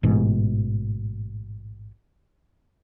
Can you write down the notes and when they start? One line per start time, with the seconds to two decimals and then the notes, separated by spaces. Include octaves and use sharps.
0.03 A1 G#2 B2